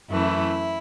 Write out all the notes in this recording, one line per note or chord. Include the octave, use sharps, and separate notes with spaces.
F#2 E3 A3 E4